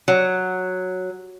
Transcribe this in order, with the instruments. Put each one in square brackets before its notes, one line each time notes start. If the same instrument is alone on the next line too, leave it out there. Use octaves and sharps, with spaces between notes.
[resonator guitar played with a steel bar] F#3